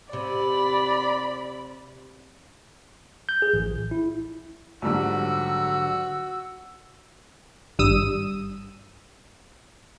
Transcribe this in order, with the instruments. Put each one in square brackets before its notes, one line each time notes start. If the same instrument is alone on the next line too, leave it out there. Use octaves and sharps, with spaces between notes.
[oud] C3 [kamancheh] D5 B5
[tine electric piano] G6
G#4
A1
A#1
E4
[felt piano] A#1 G#2 G3 [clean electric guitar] D3 F#3 [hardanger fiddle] F#4 [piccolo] E6
[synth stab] G#1 G2 G3 D#6 E6 D#7